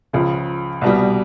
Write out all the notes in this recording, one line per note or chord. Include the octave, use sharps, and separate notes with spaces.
C#2 C#3 F3
C2 B2 G3